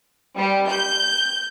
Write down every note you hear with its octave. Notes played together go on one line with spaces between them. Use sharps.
G3
G6